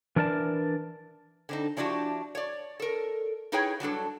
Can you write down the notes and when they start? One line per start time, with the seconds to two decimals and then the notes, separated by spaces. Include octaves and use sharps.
0.16 E3 D4 A#4 D5 A5
1.49 D3 C4 D#4
1.77 F3 C#4 D4 E4 F#4 G4
2.35 C#5 D5
2.80 A4 A#4
3.52 D#4 E4 G#4 B4 C#5 G5
3.80 F#3 G3 D4 A4